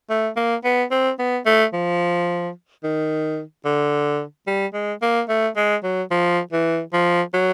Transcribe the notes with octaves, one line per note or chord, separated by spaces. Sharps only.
A3
A#3
B3
C4
B3
A3
F3
D#3
D3
G3
G#3
A#3
A3
G#3
F#3
F3
E3
F3
F#3